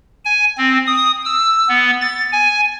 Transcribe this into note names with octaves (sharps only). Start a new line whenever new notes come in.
G#5
C4
D#6
E6
B3
A6
G#5